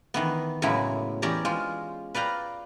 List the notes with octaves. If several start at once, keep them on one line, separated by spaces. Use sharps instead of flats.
D#3 E3 B3
F#2 A2 C#3 F#3 G#3 E4
E2 C#4 G4 D5 A#5
G#3 F4 G5
B4 D5 F5 G5 A#5